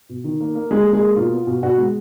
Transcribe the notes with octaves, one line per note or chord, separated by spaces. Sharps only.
B2
D#3
A#3
A#3
G#3 A#3 G#4
A#3
G#3 G#4
A#3
B2 F4
B3
B2
B2 F#4
G#3